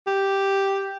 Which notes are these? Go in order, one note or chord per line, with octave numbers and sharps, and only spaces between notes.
G4